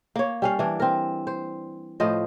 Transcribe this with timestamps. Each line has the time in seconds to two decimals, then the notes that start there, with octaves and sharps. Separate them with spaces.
0.16 A#3 C#5
0.42 G3 C#4 F5
0.59 E3 D4
0.80 C4 A#4
1.27 C5
2.00 A2 F3 C5 D#5